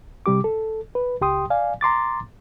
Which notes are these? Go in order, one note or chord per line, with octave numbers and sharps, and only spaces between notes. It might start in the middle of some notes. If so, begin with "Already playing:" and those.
C3 G3 G4 D6
A4
B4
C#2 G4 G5 C6 D#6
D5 F5 G#5
A#5 C6 D6 A6